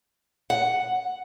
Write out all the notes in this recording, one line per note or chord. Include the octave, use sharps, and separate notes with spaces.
F#5